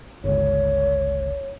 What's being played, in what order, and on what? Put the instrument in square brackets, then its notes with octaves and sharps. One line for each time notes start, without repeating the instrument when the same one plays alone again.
[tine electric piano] G1 C#2 [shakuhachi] C#5